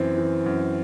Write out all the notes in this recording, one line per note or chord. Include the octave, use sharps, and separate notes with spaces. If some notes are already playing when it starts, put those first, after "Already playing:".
Already playing: F#2 E3 C4
E3
F#2